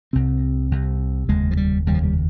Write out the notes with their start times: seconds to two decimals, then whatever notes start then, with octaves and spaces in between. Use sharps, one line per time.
0.13 C2 C3 C4
0.71 C2 C3
1.28 F1 D#2 C#3 G#3
1.51 F3
1.57 G3
1.86 F1 D#2 C#3 G3
1.94 F3
2.03 G3